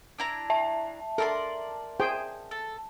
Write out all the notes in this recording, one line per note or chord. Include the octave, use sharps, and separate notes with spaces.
D4 E4 A#5
E5 A5
A4 A#4 D5 C6
G#4 C5 G5
A4